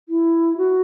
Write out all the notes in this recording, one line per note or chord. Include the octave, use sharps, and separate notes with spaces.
E4
F#4